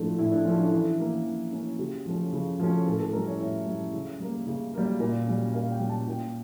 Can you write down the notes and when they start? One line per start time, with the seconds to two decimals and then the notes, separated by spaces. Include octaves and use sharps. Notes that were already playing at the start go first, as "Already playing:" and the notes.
Already playing: A2 F3 A3 D4
0.18 A2 E4
0.32 D4
0.45 F3 A3 C#4
0.59 D4
0.71 E3 E4
0.99 A#3 C#4
1.26 E3
1.53 A#3 C#4
1.79 C#3 G4
2.06 F3 A3 C#4
2.33 C#3
2.60 F3 A3 C#4
2.86 A2 A4
3.00 A4
3.12 G3 C#4 A#4
3.27 C#5
3.40 A2 E5
3.67 G3 C#4
3.93 C#3
4.20 G3 A#3
4.47 C#3
4.74 G3 A#3
5.00 A#2
5.27 G3 C#4
5.53 A#2 F5
5.71 G5
5.80 G3 C#4
5.89 A5
6.07 A#2 G5